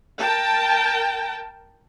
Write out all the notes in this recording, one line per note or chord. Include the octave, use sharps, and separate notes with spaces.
A#4 G5 A5